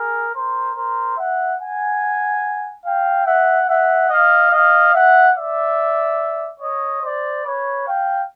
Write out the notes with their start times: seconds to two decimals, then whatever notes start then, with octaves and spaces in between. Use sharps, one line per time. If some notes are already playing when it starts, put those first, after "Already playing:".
Already playing: G#4 A#4
0.33 A#4 C5
0.75 A#4 C5
1.16 E5 F#5
1.58 F#5 G#5
2.84 F5 G5
3.25 E5 F#5
3.67 E5 F#5
4.09 D#5 F5
4.50 D#5 F5
4.93 E5 F#5
5.35 D5 E5
6.60 C#5 D#5
7.02 C5 D5
7.43 B4 C#5
7.85 F5 G5